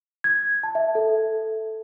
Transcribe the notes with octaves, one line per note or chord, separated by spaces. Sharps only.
G#6
A5
E5
A4